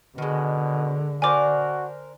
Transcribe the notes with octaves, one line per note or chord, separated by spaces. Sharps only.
B2 D3 D#3 G#3
D4 F#4 A#4 C5 G#5 D6